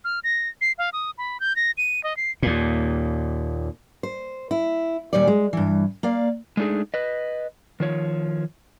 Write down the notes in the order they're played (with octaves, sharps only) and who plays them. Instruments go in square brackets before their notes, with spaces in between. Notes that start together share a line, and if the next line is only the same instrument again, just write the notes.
[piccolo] F6
A#6
C7
F5
D#6
B5
G6
A#6
D#7
D#5
C7
[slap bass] D#2 A#2
[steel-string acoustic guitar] C5
E4
D#2 A#2 G3 C#5 D5
G#3
G2 E3
A#3 D5 F5
[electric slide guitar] G#3 A3 D4 D#4 G#4
B4 D#5
D#3 F3 C#5